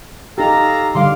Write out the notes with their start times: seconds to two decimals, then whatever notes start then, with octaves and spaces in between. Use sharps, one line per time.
0.38 D#4 G4 A4 F5 A#5
0.95 D3 G3 F5 C6 D6